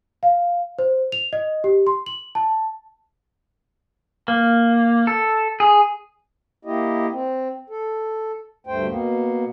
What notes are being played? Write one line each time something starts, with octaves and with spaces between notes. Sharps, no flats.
F5
C5
F7
D#5
G4
C6
F#7
A5
A#3
A4
G#4
A#3 E4 G4 D#5
C4
A4
D2 G2 A3 C5 G5
B2 A#3 B3